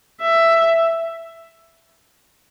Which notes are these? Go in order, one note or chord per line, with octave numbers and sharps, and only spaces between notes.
E5